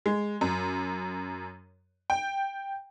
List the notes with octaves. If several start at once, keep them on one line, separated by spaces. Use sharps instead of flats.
G#3
F#2
G5